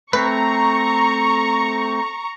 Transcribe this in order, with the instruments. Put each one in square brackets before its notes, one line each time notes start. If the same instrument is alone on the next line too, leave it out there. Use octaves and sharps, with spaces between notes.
[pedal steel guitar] A3 C4 [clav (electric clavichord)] B4 [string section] A#5 C#6